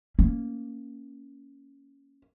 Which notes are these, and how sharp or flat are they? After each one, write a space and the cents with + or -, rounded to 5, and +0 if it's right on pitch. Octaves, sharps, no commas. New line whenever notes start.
A#3 +0 C#4 +0